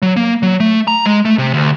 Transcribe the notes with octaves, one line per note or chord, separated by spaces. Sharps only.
F#3
A#3
F#3
A3
A#5
G#3
A3
C3
D2